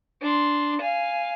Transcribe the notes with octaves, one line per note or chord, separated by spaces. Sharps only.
D4 C6
F5 G#5